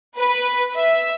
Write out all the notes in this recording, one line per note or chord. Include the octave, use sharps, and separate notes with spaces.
B4
E5